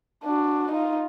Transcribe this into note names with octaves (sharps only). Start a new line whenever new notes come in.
D4 F#4
D#4 F4